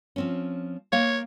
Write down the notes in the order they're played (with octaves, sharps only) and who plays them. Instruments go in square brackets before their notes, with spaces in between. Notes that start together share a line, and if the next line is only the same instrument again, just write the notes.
[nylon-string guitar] F3 C4 C#4
[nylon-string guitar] A#3 F5 [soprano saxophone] C#5